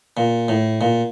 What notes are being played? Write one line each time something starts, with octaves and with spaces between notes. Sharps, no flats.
A#2
A2
A#2